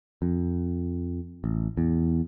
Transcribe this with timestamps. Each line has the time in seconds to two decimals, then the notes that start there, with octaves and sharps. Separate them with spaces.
0.22 F2
1.44 A1
1.77 E2